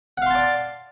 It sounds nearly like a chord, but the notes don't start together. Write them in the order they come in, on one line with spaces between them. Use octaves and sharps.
F#5 F5 C6 A5 D5